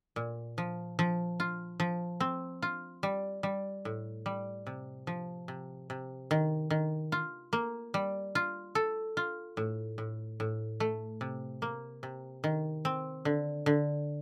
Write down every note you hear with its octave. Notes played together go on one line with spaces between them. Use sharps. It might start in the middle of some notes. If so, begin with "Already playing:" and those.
A#2
F3
F3
F4
F3
C4
F4
G3
G3
A2
G3
C3
F3
C3
C3
D#3
D#3
F4
A#3
G3
F4
A4
F4
A2
A2
A2
A3
C3
A#3
C3
D#3
C4
D3
D3